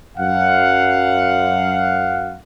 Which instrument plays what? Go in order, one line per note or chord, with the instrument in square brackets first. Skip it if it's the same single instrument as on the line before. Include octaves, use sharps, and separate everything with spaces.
[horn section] F#2 F5 F#5